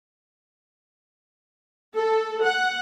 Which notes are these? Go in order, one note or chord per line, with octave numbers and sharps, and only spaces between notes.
A4
F#5